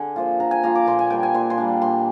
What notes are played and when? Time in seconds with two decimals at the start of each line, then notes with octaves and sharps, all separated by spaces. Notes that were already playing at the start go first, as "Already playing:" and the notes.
Already playing: D3 G#5
0.16 F3 A#3 F4
0.40 D3 A#5
0.51 G#5
0.64 F3 A#3 F4 A#5
0.75 D6
0.86 A#2 C6
0.99 G#5
1.10 G3 A#3 D4 G5
1.23 G#5
1.34 A#2 C6
1.50 C6
1.58 G3 A#3 D4
1.82 A#2 C6